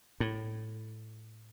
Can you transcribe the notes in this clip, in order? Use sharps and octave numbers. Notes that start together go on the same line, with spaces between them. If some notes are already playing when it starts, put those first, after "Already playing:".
A2